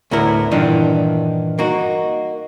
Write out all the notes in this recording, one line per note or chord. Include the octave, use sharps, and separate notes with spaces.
D2 A2 B3 E4 A#4
G2 A#2 D#3 E3 B3 D4
A#3 D#4 F#4